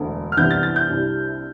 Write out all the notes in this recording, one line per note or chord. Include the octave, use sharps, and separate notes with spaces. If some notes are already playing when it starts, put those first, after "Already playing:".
Already playing: E1 D2 D3
F6
C2 C3 E3 B3 D4 G6
A6
A6
G6
C2 C3 G3 D4